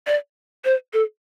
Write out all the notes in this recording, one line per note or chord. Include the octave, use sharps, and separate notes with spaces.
D5
C5
A4